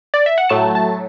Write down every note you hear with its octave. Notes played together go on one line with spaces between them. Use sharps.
D5
E5
F#5
A2 F#3 A3 A5
A5